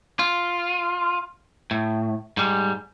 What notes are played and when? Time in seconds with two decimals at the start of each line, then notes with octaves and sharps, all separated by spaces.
0.19 F4
1.71 A2
2.37 G#2 G3